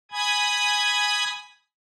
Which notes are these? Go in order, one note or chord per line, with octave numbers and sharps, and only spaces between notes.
G#5 B5 D#6 G#6